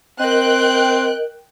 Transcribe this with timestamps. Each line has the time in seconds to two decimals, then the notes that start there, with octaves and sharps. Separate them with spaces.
0.19 C4 A#4 D#5 G5 F#6